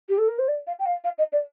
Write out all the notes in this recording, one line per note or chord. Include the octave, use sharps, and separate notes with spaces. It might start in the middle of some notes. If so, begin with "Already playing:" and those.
G4
A4
A#4
C5
D5
F5
G5
F5
F5
D#5
D5